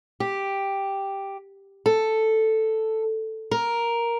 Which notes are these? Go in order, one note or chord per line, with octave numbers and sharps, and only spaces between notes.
G4
A4
A#4